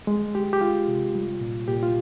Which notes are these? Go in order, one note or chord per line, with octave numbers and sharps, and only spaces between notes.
G#3
G#3 G4
G4
G#3 F4
C3
G3
A#2
A#2 G4
F4